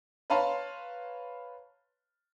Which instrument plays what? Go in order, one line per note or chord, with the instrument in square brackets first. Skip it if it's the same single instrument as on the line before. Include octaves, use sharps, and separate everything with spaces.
[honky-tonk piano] B4 C#5 F5 A5 A#5 C6